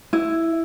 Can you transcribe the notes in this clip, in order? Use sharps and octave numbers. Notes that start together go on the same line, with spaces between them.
E4